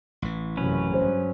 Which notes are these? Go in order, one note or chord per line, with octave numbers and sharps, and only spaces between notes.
A1 E3
F#1 F#2 C3 F#3 C#4 B4
G2 G#3 C5